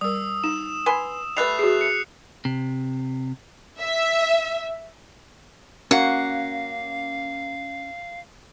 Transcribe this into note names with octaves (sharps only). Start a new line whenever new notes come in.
G3 A#4 D#6 E6
D#4 E7
B4 G#5 C6
G3 A3 B4 F#6 C7 F7
F#4 G#4 C7
C#7
C3
E5
A#3 C#4 F#4 F5 F#5 A#5